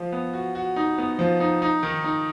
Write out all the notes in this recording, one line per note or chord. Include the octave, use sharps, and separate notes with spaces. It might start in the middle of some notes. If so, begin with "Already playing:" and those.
Already playing: F3
B3
F#4
F#4
D#4
B3
F3
D#4
D#4
D#3
D#4